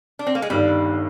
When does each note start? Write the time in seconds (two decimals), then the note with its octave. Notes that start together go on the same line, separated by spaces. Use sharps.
0.19 D4
0.27 C4
0.35 A#3
0.42 G#3
0.50 G1 G2 D#3 G3